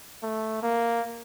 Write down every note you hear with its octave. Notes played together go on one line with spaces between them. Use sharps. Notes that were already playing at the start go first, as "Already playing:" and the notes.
A3
A#3